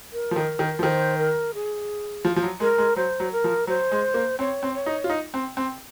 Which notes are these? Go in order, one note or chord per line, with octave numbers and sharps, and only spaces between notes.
A#4
F3
D#3
D#3
F3
D#3 C5
A#4
G#4
F3
F3
F#3
G#3 A#4
G#3
F#3 C5
F#3
A#4
F3
F#3 C5
G#3
A#3
C4 C#5
C4
C#5
D#4
F4
D#4
C4
C4